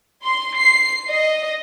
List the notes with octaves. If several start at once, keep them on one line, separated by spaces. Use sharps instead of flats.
C6
C7
D#5